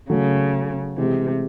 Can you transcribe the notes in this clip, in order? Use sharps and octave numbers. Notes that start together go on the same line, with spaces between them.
C#3 F#3 A3
C3 E3 G#3